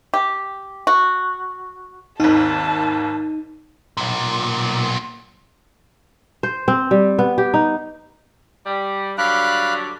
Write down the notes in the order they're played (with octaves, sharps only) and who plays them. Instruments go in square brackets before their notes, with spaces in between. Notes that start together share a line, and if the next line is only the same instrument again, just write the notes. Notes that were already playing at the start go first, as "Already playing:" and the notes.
[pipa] G4
F#4
[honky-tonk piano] G#1 D#2 [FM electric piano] D#4 [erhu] A5
[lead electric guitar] B1 A#2
[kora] C5
C4
G3
B3
G4
D#4
[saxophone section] G3
[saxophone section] D3 F#3 G3 [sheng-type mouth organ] F5 B5 F#6